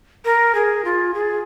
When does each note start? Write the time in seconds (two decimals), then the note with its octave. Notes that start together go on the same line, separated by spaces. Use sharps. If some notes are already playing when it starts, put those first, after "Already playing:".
0.25 A#4
0.55 G#4
0.85 F4
1.14 G#4